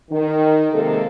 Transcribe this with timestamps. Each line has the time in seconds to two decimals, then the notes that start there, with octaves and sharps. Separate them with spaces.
0.11 D#3
0.73 C3 G#3 A#3 A4